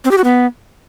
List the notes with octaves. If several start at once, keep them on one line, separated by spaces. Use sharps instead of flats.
C4
G4
F#4
B3